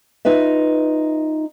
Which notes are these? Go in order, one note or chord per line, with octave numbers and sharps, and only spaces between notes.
D#4 F4 B4 E5